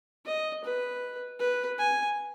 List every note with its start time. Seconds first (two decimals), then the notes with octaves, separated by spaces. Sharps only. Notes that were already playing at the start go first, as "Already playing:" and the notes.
0.26 D#5
0.64 B4
1.40 B4
1.78 G#5